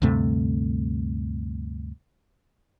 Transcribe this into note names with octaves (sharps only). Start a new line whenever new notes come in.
D2 G2 C3 A3